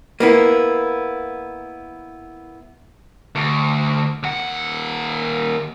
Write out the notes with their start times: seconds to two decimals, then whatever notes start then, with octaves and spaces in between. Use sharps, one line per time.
0.20 A#3 B3 E4
3.35 D2
4.23 D#2 F#5